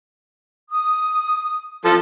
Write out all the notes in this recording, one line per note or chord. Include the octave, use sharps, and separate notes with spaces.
D#6
F3 A4